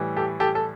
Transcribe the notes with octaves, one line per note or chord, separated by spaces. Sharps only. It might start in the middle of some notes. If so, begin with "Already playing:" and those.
Already playing: A2 E3 G3
G4 A4
G4 A4
A4